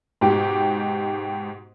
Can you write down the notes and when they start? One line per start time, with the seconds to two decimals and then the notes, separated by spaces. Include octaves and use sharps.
0.21 G#2 B2 G4